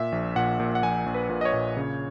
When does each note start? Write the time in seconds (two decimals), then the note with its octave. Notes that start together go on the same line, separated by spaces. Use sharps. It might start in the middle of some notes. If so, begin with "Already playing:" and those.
Already playing: A#2 E5
0.12 A#1
0.36 A#2 F#5
0.60 A#2
0.75 F#5
0.83 A#1 G#5
1.06 A#1
1.14 B4
1.29 A#2
1.41 D#5
1.45 C#5
1.53 A#2
1.77 C#3